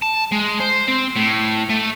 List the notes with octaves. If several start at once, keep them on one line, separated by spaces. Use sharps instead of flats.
A5
G#3
C5
C4
A2
A3